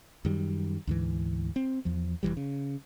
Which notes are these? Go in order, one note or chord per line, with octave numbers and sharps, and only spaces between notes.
F#2 D#3 G3
D2 G#2 E3
C4
E2 F3
F1 D#2 E3 G3
C#3